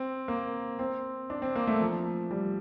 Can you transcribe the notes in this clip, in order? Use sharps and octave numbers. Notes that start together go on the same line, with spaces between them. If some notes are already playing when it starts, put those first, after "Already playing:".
Already playing: C4
A#3
C4
D4
C4
A#3
A3
F3
G3